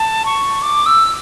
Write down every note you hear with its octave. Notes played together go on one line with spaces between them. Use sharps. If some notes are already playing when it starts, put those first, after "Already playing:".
Already playing: A5
C#6
D6
E6